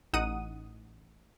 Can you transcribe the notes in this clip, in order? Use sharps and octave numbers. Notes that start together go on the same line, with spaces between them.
A1 D#4 F#5 D#6 D#7